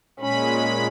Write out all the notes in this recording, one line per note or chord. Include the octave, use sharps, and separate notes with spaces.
A#2 G#3 C#4 B5